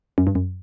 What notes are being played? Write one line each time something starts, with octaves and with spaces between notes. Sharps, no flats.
F#2
G2
F#2